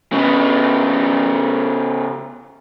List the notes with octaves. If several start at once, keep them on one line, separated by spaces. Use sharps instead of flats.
C#3 B3